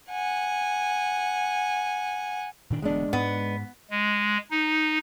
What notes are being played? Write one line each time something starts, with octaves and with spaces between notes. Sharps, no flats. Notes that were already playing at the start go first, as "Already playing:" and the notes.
F#5 G#5
A#2 D#3 D4
E1 D3 G#3 B3 D4
G#2 B3
G#3
D#4